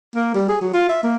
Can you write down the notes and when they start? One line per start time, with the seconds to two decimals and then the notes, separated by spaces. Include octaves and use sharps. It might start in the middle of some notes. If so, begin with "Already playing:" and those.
0.15 A#3
0.35 G3
0.49 G#4
0.61 F#3
0.73 F4
0.89 E5
1.04 A#3